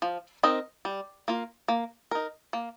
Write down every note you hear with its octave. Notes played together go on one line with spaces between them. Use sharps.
F3
C4 D#4 A#4 D#5
G3
A#3 F4
A#3
D#4 A#4
A#3